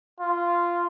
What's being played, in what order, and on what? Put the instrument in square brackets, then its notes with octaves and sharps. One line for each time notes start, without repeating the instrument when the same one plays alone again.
[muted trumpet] F4